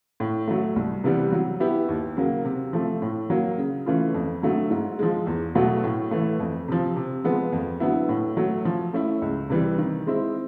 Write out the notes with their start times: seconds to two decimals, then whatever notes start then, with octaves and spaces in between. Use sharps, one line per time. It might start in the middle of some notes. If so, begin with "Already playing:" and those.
0.20 A2
0.48 F#3 A3
0.76 C2
1.04 C3 E3 G3 B3
1.32 F#3
1.60 B3 E4 G4
1.89 D#2
2.17 C#3 F#3 A#3
2.45 C3
2.73 F3 A3
3.02 A2
3.30 F#3 A#3
3.58 C#3
3.86 E3 A3 C#4 F4
4.14 F2
4.42 D3 F#3 A3
4.71 G#2
4.99 F3 G#3
5.27 E2
5.55 B2 F#3 A3
5.84 A2
6.11 E3 A3
6.40 F2
6.68 C3 F3
6.96 C3
7.24 F3 G#3 B3
7.53 F2
7.80 D3 F#3 B3 E4
8.09 A2
8.37 F#3 A3
8.65 F3
8.93 A3 C#4 E4
9.22 C#2
9.50 C3 E3 G3
9.78 D#3
10.07 G#3 C4 E4